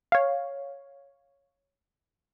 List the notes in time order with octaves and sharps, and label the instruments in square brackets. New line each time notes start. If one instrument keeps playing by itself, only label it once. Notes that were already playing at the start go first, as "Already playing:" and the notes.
[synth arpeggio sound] C#5 F5